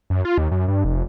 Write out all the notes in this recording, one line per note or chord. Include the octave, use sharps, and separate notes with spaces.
F#2
F4
D#2
F#2
G2
F1